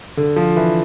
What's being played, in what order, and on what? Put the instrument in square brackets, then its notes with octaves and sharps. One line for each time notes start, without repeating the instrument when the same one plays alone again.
[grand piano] D3
F3
E3